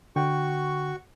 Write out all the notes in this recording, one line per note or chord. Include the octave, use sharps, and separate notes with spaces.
D3 F#4 G5 C#6